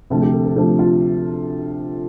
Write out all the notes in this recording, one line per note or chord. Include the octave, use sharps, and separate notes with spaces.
D2 C3 F3 F4
G4
A4
A4
D2 C3 F3 G4
F4